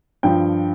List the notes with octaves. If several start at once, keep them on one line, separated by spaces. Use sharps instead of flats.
G2 F3 G5